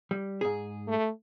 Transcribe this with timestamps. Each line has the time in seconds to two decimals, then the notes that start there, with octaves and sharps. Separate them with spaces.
0.11 G3
0.41 G#2 G#4
0.88 A3